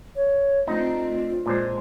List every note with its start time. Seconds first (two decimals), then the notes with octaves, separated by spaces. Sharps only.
0.15 C#5
0.67 A3 C4 D4 D#4 F4
1.46 A#2 G#3 D4 C5